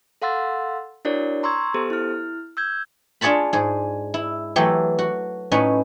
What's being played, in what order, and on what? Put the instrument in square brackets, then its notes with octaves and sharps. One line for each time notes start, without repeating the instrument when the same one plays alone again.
[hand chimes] A4 F5 F#5 C6 E6 A6
D4 E4 F#4 A#4 C#5 D5
A#5 C6 C#6 E6 G#6
B3 G4 A4 C5
E4 F6
E6 G6 G#6
[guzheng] D4 F4 G#4 C#5 A5 B5
G#2 G#4
E4
E3 F#3 A3 G4
F#4
A2 C#4 D#4 B4